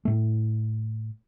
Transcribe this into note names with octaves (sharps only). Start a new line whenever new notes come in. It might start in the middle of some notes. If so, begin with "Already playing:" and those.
A2 A3